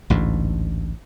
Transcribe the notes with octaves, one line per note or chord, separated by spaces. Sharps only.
A1 D2 G#2